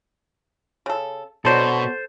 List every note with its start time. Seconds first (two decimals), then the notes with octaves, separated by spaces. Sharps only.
0.86 C#3 A4
1.45 B2 D3 F#3 D4 A4 C5